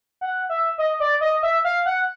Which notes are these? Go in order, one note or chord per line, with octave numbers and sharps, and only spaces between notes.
F#5
E5
D#5
D5
D#5
E5
F5
F#5